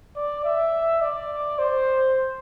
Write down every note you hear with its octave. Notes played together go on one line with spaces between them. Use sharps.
D5
E5
D5
C5